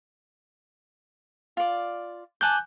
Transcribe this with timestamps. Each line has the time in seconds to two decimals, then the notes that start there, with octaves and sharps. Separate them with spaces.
1.57 F4 D5
2.41 G#5 A5 D6 F#6 G6